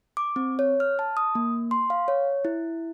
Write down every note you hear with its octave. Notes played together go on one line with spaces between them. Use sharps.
D6
C4
C#5
F6
A5
D#6
A#3
C6
F5
C#5
E4